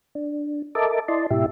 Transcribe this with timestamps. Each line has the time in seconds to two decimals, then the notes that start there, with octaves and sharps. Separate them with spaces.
0.15 D4
0.75 A4 A#4 D#5 E5 A5 D6
1.08 E4 D5 D#5 A5 C6
1.31 G#2 B2 E4 G4 E5